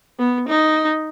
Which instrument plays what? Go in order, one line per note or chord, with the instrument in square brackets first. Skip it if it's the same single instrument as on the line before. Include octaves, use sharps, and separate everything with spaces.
[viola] B3
D#4